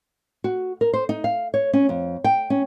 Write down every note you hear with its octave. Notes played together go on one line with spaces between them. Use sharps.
F#4
A#4
C5
D#4
F5
C#5
C#4
F2
G5
C#4